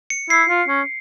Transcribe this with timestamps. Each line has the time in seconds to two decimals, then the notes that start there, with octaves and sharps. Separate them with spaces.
0.10 C#7
0.30 E4 C7
0.49 F4
0.68 C#4